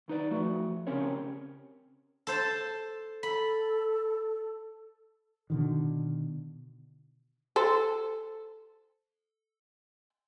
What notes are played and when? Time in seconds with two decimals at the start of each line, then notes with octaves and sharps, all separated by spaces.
0.08 D#2 D#4 B4 D5
0.31 F3 A3 F#4
0.87 C#3 C4 C#4 G4 A#4 C#5
2.27 A4 C5 A5
3.23 A4 B5
5.50 B2 D3 D#3
7.56 A4 C5